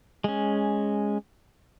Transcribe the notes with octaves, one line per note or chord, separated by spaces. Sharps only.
G#3 C#4